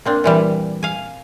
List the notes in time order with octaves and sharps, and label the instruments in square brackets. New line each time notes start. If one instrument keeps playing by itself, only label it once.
[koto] A#3 C4 D4
A#2 E3 G3
F5 G#5